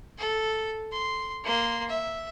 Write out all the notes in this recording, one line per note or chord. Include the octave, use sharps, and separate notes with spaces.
A4
C6
A#3 C6
E5